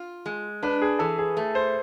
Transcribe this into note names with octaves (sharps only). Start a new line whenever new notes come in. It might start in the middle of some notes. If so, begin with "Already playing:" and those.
Already playing: F4
G#3
D4 B4
G#4
E3 A4
G#4
A3
C5